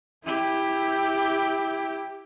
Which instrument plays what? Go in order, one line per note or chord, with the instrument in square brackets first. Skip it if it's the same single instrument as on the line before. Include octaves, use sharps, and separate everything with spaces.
[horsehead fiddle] E4 G4